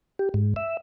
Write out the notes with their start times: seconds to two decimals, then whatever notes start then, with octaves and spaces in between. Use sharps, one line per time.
0.19 G4
0.34 G#2
0.56 E5